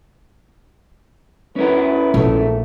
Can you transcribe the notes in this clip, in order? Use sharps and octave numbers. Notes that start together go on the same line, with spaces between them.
D2 C#4 E4 A#4 B4
A#1 E2 G#2 A3